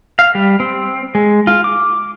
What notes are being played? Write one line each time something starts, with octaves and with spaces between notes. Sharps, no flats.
F5
G3
C4
G#3
F4
D6